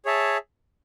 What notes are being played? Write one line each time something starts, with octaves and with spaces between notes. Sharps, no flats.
G#4 C#5 E5 A5